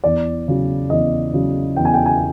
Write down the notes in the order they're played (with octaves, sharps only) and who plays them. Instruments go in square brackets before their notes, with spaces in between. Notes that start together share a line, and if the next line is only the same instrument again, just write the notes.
[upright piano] E2 D5
C#3 F#3
E2 D#5
C#3 F#3
E2 G5
G#5
G5
G#5